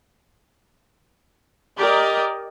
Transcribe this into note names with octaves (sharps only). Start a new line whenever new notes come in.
G4 A#4 D5 D#5